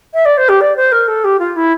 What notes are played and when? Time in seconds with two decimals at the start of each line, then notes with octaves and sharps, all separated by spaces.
0.14 E5
0.25 D5
0.37 C5
0.49 G4
0.61 D5
0.76 C5
0.92 A#4
1.08 A4
1.24 G4
1.39 F4
1.56 E4